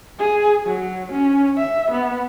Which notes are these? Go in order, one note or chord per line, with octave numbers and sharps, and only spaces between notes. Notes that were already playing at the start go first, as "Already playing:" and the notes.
G#4
F#3
C#4
E5
B3